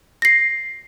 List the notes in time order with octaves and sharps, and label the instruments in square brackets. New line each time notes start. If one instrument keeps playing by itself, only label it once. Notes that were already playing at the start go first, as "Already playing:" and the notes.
[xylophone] A#6 C7